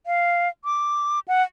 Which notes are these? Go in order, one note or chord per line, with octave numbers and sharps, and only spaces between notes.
F5
D6
F#5